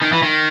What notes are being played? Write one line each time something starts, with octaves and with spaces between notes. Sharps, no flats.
D#3
E3
D#3